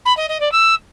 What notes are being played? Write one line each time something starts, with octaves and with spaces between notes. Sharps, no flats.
B5
D#5
D#5
D5
E6